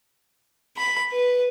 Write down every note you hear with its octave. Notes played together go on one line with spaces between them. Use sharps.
B5
B4